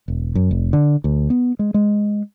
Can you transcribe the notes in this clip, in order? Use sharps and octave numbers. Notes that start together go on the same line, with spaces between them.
E1
F#2
F1
D3
D2
B3
G#3
G#3